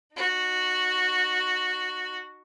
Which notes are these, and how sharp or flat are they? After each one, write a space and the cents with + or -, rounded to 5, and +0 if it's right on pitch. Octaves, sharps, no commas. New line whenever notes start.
D#4 -30 F#4 -5